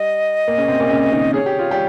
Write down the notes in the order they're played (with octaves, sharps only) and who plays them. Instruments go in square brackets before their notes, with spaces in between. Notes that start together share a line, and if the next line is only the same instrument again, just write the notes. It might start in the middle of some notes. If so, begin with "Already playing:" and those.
Already playing: [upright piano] G3 [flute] D#5
[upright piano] A#2 A#3
C#3 C#4
C3 C4
A#2 A#3
C#3 C#4
D#3 D#4
[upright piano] G#4 [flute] C#5
[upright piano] G4
F4
G3 G4